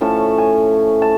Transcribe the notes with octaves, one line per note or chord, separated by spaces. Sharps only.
A2 F3 A3 C#4 A5
G#5
A5